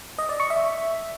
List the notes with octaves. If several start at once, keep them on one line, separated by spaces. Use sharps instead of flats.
D#5
D5
C#6
E5